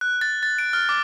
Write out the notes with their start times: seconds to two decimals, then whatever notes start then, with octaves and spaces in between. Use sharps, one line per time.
0.01 F#6
0.21 A6
0.43 A6
0.58 D7
0.73 F6
0.89 D6